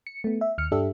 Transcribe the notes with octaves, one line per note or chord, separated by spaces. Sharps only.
C#7
A3 B3
E5
D#2 F6 C#7
G2 D4 G4 A4 E5